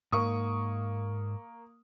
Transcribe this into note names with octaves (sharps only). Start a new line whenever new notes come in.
G#2 A#3 C#6 D#6